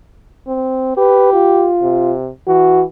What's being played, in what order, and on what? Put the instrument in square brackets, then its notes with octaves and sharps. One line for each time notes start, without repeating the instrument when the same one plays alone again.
[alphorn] C4
[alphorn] G4 [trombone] B4
[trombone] F4
[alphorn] C3
[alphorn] E3 [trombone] F#4